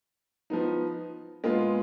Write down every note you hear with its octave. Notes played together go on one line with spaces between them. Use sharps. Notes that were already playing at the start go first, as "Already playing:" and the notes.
F3 B3 D#4
A#2 G#3 B3 F4